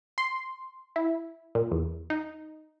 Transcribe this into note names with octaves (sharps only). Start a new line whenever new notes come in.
C6
E4
A#2
E2
D#4